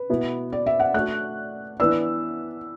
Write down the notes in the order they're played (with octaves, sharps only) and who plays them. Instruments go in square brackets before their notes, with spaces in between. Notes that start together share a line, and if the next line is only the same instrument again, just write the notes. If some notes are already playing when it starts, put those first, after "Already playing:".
Already playing: [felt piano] B4
[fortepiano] B2 B3 E4
[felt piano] D5
E5
F#5
[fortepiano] A3 D4 F#4 D5 [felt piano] F#6
[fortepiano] E3 B3 D4 [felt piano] E6